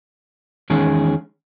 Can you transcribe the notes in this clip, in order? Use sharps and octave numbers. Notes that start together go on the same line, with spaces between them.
E2 D#3 G#3 C#4 G#4